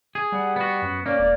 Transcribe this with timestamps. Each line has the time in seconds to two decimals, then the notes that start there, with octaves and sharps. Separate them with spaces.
0.15 G#4
0.32 G3 F#5
0.56 B3 F#4
0.82 F#2
1.06 A#3 C#4 D5
1.19 E1 D5